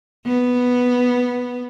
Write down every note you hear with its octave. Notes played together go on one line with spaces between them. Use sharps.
B3